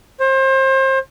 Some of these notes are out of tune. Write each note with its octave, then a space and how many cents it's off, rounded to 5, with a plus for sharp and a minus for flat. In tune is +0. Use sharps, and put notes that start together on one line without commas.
C5 +30